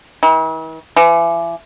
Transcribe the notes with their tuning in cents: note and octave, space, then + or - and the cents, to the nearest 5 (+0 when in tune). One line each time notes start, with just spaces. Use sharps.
E3 -45
E3 +35